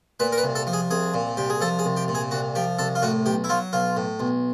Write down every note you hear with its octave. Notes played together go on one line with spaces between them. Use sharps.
A#2 B4
A#4
B4
C2
A4
F3
G#4
C2 G#4
A#2
C2 G4
G#4
F3 A4
G#4
C2
G4
A#2
G#4
C2 F#4
F3 G4
C2 A4
F4
A2 F#4
B1 G4
E4
F#3 F4
B1 F4
A2
B1